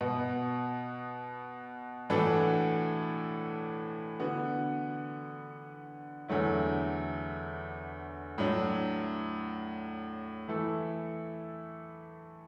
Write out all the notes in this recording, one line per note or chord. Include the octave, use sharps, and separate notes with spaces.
B2 B3 F#4
A2 E3 D4 F#4 A4
D3 B3 F#4
E2 D3 F#3 A3 E4
A2 F#3 D4
E3 A3 E4 A4